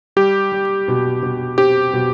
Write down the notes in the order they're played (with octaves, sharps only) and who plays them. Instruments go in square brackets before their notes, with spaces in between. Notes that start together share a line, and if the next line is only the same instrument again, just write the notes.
[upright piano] G3 [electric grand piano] G4
[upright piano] G3
B2
B2
[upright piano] C4 [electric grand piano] G4
[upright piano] B2